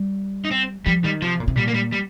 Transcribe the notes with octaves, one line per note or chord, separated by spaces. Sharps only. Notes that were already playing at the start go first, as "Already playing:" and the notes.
Already playing: G3
D#4
C4
F3 G3
D#3 G3
C3 F3
A#2
C3
A#2 G3
A#3
G3
G3